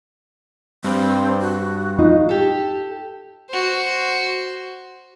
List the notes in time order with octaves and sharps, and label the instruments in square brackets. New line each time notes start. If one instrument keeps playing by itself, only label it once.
[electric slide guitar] G2 [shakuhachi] C4
[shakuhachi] F#4
[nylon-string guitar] D#4 F4
[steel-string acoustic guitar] G4 A4
[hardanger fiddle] F#4 C5